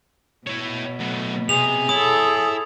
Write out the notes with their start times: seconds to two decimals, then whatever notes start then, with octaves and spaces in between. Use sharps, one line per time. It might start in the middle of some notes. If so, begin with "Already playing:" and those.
0.47 B2 E4 C#5
1.00 F#3 A3
1.49 C3 G#4 F7
1.89 E4 A4 C#5 D#6